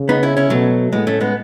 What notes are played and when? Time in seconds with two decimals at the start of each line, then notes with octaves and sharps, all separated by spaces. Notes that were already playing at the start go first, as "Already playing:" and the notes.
Already playing: C#3
0.09 B3 D#4
0.23 C#4 E4
0.37 C#4 E4
0.50 B2 F#3 A3
0.92 A2 G#3 B3
1.07 A3 C#4
1.20 G#3 B3